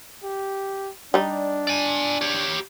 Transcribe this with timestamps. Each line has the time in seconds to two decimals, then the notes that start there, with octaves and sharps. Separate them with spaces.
0.23 G4
1.14 G3 D4 D#4
1.67 D5 G#5
2.21 G4 C#5